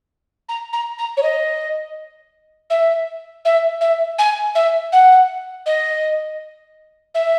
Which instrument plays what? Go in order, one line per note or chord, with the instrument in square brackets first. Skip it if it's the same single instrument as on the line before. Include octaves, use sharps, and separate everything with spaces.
[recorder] A#5
A#5
A#5
C#5
D#5
E5
E5
E5
G#5
E5
F#5
D#5
E5